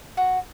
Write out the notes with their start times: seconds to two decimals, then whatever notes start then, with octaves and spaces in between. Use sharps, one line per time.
0.17 F#4